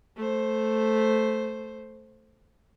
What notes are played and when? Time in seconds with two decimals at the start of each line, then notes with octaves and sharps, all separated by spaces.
0.17 A3 C5